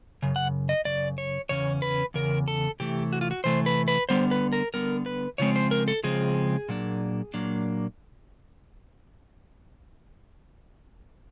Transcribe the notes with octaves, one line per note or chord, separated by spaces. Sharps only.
F#2 C#3
F#5
D#5
F#2 C#3 D5
C#5
E2 C#3 C#4 C#5
B4
E2 C#3 A#4
A4
C3 E3 A3 G4
F#4
F4
F#4
C3 E3 A3 C5
B4
B4
D3 G3 B3 C5
B4
A#4
D3 G3 B3 A#4
B4
C#3 F3 G#3 C4 C#5
C5
A#4
A4
C#3 F3 G#3 C4 G#4
A#2 F#3 A#3 D4
A#2 F#3 A#3 D4